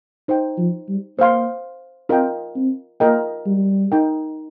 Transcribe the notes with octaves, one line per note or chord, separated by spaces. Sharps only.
D#4 C5 G5
F3
G3
A#3 C5 F5 C6
C4 F4 A#4 D#5 G5
C4
A#3 F4 A#4 D#5 G5
G3
D#4 A#4 G5